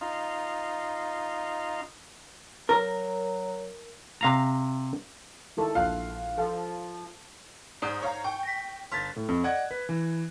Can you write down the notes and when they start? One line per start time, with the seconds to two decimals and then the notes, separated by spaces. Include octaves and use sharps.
0.01 D#4 F4
2.69 F#3 A#4
4.21 C3 F5 A#5
5.57 D#3 G#3 E4 A4
5.75 A#1 F4 F5 F6 F#6
6.38 F3 A4
7.82 G#2 D#4 C5 D5 D#6 G6
8.02 C#5 F5 A#5
8.24 G5 G#5 C#6
8.43 A#6 B6
8.92 G1 C6 F6 A6 B6
9.16 A2
9.29 F2
9.44 D5 D#5 F#5 F#6 G#6
9.71 B4
9.89 E3